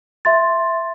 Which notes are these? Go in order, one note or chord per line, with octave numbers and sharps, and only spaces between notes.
E5 C6 A6